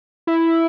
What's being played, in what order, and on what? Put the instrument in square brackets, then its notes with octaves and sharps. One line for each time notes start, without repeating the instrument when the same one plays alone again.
[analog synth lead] E4